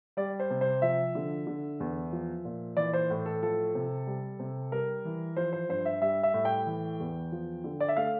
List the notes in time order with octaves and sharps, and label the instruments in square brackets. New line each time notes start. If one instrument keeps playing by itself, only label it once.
[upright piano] G3 D5
C5
C3
C5
F3 E5
D3
D3
E2
F3
A#2
E3 D5
C5
A2
A4
F3 A4
C3
G3
C3
G3 A#4
E3
F3 C5
C5
G2 C5
E5
G3 E5
E5
A2
G5
E3
E2
F3
D3
D5
E5
A3 F5